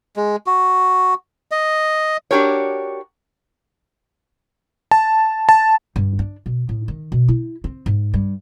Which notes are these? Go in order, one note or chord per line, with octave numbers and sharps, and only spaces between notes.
G#3
F#4
D#5
D4 F#4 G4 A#4 C#5
A5
A5
G2
D4
B2
A2
D#3
B2
E4
C4
G#2
G2